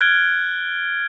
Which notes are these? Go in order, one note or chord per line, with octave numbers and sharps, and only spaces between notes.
F6 F#6 G#6 A6 D7 G7